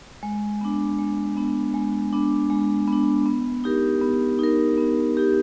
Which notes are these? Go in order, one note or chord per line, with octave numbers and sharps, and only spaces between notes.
G#3
B3 D4
G#3
B3 D4
G#3
B3 D4
G#3
B3 D4
B3
D#4 G4 A#4
B3
D#4 G4 A#4
B3
D#4 G4 A#4